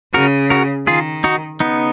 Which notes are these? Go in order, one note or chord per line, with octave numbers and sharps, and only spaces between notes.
C#3 F#4 A#4
F#4 A#4
D#3 F4 G#4
D#4 F#4
C#3 B3 D#4